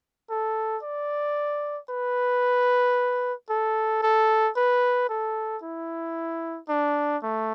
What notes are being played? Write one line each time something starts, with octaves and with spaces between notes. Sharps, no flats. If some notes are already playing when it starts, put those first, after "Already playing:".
A4
D5
B4
A4
A4
B4
A4
E4
D4
A3